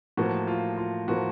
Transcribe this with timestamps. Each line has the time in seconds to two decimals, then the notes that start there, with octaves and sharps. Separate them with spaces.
0.17 A2 F3 A#3 F#4
0.47 F4
0.77 F4
1.08 A2 F3 A#3 F#4